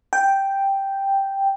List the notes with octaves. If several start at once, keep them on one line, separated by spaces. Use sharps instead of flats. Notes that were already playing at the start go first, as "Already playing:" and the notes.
G5